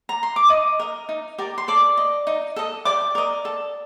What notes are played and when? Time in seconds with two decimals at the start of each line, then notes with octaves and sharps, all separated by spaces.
0.09 A#5
0.23 C6
0.36 D6
0.50 D#4 D#5 D#6
0.79 A#4 D#5
1.09 D#4
1.38 G4 A#4 D5
1.58 C6
1.68 A4 D5 D6
1.97 D#5
2.27 D#4
2.56 A4 D#5
2.85 G4 D5 D6
3.15 A#4 D#5
3.45 A4